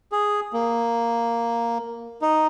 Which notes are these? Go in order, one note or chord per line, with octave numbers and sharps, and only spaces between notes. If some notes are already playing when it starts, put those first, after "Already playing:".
G#4
A#3
D#4